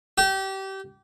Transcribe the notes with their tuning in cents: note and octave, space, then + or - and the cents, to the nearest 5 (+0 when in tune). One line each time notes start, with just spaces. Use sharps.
G4 -25